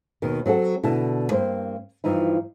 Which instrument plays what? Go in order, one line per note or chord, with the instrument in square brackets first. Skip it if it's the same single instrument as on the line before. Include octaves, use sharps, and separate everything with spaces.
[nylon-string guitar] D#2 B2 D#3
F#3 C4 F#4 A4
B2 D3 E4 A5
G2 A#3 C4 C5
G2 E3 F3 D#4 E4